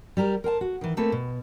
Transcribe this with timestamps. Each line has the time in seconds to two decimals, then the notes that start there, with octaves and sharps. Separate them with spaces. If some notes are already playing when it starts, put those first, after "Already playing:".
0.17 G3 G4 A#4
0.44 A#4 C5 G#5 A5
0.61 F#4
0.81 D#3 E3
0.97 A3 A#3 C4 F4 A4 B4
1.12 B2